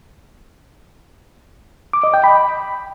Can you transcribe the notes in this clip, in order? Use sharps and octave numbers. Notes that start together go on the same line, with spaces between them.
D6
D#5
G5
B5